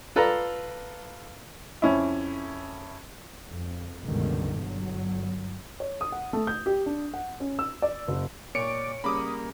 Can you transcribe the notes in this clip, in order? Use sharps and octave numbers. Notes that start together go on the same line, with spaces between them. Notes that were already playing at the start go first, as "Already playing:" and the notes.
F4 A4 B4 D5 F5 A#5
F2 C#4 E4
F2
C#2 G2 B2 D3 D#3
G1 F#3
C#5
D#6
F#5
A3
G6
G4
D4
F#5
C#4
E6
D5
F#1
A#2 C#5 D5 C#6 C#7 D7
C#3 G3 A#3 B5 D6 D#6